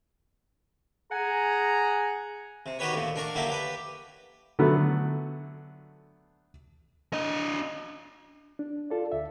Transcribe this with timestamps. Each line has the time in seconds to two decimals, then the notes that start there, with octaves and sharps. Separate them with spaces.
1.11 G#4 F#5 G#5 A#5
2.66 C3
2.79 D#3 F#4 G4 B4 C#5
2.93 D2 A#2
3.16 D4 A#4 C#6
3.35 D3 F#3 A#3 E4 G4
3.49 G4 B4
4.59 D3 F#3 A3 B3
7.13 D4 D#5
8.59 D4
8.90 F4 A4 D5
9.12 D2 E5